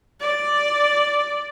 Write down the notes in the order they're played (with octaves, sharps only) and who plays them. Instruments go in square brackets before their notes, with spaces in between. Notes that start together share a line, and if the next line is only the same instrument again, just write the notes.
[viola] D5